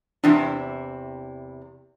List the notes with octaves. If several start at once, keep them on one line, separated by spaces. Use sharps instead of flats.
E2 C3 D4 E4